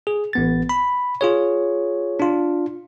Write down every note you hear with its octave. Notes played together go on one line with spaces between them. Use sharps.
G#4
A1 B3 A6
B5
F4 G#4 C#5
D4 F4